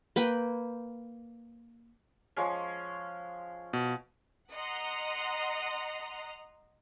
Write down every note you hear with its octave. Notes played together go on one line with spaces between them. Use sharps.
A#3 B4 G5
F3 G#3 C#4
B2
D#5 F#5 A#5 C6